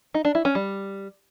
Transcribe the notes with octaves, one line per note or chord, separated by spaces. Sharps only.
D#4
D4
E4
C#4
G3